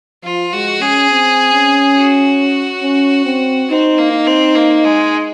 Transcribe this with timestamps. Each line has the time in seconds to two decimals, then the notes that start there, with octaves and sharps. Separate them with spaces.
0.24 F3 F4
0.53 G#3 F#4
0.81 C#4 G#4
1.10 C4
1.53 C#4
1.97 F#4
2.82 C#4
3.26 C4
3.70 C4 D#4
3.98 A#3
4.13 D#4
4.27 C4
4.55 A#3
4.85 G#3